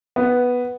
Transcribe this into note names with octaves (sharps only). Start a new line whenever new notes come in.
B3